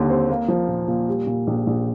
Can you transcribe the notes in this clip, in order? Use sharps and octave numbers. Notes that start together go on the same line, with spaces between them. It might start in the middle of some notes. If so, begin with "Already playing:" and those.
Already playing: D#2 D3 G3
C4
A#3
F3
A#2
A#2
G3
A#2
A#1
A#1